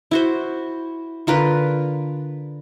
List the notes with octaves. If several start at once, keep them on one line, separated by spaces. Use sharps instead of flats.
E4 F#4 C5
D3 F4 A#4 B4